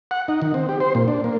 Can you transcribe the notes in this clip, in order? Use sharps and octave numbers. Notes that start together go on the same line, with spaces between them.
F#5
D#4
D#3
C4
G4
C5
A#2
D4
A#3